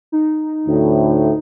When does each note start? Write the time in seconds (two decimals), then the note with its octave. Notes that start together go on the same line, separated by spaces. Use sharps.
0.12 D#4
0.67 D2 A2